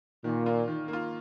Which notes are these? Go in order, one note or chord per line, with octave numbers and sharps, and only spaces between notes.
A#2 D#3
A#3 F4
D#3
A#3
F4